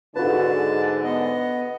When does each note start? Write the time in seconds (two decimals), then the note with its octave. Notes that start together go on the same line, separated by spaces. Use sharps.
0.16 G#2 D3 F#4 B4 A5
1.03 B3 D#5